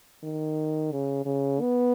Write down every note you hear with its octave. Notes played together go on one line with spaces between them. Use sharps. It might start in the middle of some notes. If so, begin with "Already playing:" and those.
D#3
C#3
C#3
B3